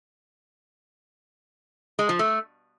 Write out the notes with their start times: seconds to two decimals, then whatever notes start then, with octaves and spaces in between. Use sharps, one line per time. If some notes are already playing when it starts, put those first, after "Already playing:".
1.99 G#3
2.09 F3
2.19 A3